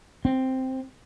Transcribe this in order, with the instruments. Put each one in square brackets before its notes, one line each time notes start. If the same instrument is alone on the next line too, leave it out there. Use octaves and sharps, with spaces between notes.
[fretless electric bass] C4